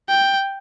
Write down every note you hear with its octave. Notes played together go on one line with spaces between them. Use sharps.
G5